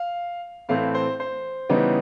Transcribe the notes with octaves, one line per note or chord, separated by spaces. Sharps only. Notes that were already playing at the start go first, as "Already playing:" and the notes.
Already playing: F5
A2 E3 A3 C4 F5
C5
C5
C#3 E3 G3 B3 D#4